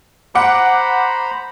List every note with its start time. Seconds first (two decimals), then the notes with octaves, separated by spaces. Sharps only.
0.35 C5 F#5 A#5 B5 D6